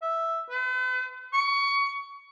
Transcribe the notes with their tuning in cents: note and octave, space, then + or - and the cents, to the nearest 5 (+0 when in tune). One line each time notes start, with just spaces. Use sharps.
E5 +0
B4 +45
C#6 +20